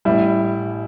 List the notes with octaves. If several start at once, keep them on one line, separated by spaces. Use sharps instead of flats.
A1 A2 G3 E4